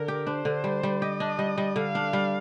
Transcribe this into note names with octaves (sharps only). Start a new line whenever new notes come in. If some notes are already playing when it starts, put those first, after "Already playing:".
Already playing: D3 A#4
G4
D4 C5
D3
G3
G3
G4 D#5
D4
G3
G3
D3 F5
D4
G3